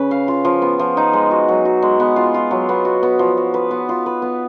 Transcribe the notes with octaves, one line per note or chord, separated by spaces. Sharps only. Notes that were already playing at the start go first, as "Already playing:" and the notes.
Already playing: C#3 C#4 B4
F5
F4
F3
B3
F3
D#4
G#3
F#4
F#3
F#4
G#3
B3
F4
F4
F#3
B3
F#4
B3
F3
F#4
B4
B3
F4
B4
B3